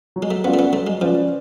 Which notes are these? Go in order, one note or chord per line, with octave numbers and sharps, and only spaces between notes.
F#3
G#3
A3
B3 C#4 F4 B4 D5
A3
B3
F#3 A3
G#3
F3 C#4 F4 B4 D5